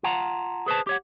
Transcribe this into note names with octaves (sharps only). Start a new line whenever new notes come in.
F4 F5 F#5 A5 A#5
G#4 B4 C5 A5
G4 C#5 F#5